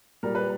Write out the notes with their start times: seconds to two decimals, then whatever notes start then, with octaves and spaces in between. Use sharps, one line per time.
0.23 A#2 G3 A#4
0.35 B4